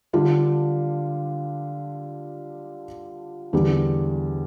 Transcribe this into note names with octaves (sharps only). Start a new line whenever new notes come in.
D3 G3 D4 F4
E2 D3 G3